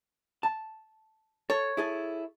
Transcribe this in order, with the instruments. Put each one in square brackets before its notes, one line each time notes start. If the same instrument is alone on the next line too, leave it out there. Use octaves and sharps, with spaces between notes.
[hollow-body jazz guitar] A5
[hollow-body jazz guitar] A4 [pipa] C#5
[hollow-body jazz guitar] E4 G#4 A4